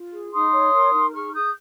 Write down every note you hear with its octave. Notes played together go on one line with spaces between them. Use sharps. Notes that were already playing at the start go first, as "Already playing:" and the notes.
Already playing: F4
G#4
D#4 C6 D#6
C#5
A#4
D#4
G#4 C#6 F6
G#4 D#6 G6